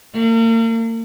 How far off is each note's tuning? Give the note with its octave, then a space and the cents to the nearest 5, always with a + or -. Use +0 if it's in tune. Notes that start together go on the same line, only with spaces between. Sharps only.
A#3 -40